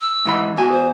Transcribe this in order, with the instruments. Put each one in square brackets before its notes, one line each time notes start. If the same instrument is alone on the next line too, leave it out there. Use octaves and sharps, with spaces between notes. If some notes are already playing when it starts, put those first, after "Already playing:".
[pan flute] E6
[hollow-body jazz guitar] G#2 E3 B5
[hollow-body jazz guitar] E2 G#5 [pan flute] F#4
[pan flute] C5